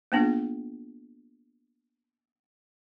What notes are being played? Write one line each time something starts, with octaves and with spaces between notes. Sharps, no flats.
A#3 B3 D4 F4 G#4